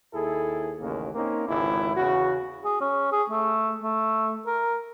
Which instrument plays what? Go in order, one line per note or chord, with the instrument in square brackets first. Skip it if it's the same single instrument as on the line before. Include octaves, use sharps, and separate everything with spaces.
[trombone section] D#2 E4 G#4 A4
A1 D#2 C#3 A#3
A#3 C4 C#4 D#4
G#1 C#2 G#2 D3 E4
E2 C#3 F#4
[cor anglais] G#4
C#4
G#4
A3
A3
A#4